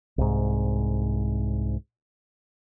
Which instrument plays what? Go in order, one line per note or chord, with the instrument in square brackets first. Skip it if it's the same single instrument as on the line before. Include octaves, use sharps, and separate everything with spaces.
[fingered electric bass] C2 G#2